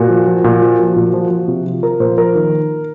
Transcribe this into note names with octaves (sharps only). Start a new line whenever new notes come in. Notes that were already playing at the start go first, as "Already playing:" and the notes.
Already playing: A#2 F#4
F3
F3
A#2
F3
F3
A#2
F3
F3
C3
F3
F3 A#4
A#2 C5
F3 A#4
D#3